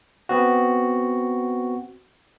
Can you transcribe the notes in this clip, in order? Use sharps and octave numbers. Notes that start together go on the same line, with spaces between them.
B3 C4 F#4